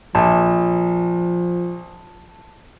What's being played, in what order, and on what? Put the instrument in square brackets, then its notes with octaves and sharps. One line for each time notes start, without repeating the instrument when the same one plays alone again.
[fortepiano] A#1 [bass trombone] F3 [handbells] A5